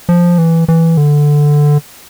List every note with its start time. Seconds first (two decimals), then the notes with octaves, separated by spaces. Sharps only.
0.09 F3
0.38 E3
0.68 E3
0.97 D3